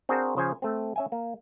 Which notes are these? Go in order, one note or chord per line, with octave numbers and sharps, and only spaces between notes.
C4 D4 F#4 G#4 A#4 C5
C#3 F3 C5 C#5 G#5
A3 C4
C#4 E5 G#5
A#3